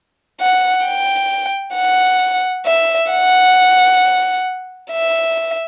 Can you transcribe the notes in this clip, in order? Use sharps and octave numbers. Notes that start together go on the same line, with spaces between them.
F#5
G5
F#5
E5
F#5
E5